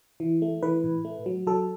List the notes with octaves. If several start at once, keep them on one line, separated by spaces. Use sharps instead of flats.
E3
A3
E3 B4
A2
A3
F#3
F#3 A4